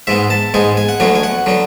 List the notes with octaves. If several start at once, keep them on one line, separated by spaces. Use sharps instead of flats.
G#2 G#3 B3 E5
A5
G#2 G#3 B3 G#5
G#5
F#5
D2 D3 F#3 B3 G#5
G#5
F#5
D3 F#3 B3